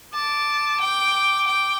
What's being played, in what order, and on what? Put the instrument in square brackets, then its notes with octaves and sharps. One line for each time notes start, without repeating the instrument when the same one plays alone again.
[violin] A5 [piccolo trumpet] D6
[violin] G5
G5